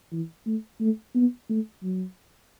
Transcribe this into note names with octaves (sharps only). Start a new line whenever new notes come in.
E3
A3
A3
B3
A3
F#3